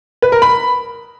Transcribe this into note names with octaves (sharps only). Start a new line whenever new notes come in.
B4
A#4
B5